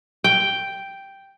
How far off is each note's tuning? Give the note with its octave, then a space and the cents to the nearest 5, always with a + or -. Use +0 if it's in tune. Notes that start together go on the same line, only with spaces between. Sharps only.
G5 +0